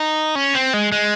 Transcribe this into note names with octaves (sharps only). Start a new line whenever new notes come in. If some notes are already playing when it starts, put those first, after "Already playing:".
Already playing: D#4
C#4
C4
G#3
G#3